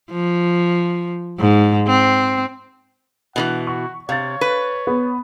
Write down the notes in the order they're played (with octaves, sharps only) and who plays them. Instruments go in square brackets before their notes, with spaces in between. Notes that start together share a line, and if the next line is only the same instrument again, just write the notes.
[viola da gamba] F3
G#2
C4
[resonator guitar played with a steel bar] B2 D#3 E3 [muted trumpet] F#5
[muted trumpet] F#4 [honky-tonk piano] C#6
[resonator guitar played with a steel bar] C3 [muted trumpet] C#5 [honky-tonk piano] F5 A6
[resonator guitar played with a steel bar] B4
[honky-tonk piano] B3